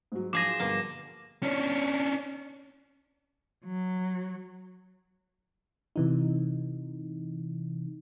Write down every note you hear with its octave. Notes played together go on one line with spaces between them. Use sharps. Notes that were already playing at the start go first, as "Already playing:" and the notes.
G#2 F#3
F3 G#4 D6 A#6
G1 B2 A#3
C#4 D4
F#3
C3 E3 D#4